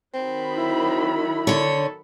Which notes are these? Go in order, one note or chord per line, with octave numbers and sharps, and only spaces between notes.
D#3 F#3 C4 B5
E4
D3 A4 C#5